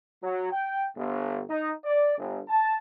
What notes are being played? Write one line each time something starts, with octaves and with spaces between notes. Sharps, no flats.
F#3
G5
G1
D#4
D5
G1
A5